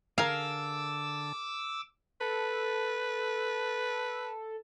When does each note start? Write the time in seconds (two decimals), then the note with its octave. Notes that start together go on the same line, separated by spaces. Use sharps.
0.18 D3 G#4 A#4 F5 A5 D6 E6
2.21 A4 B4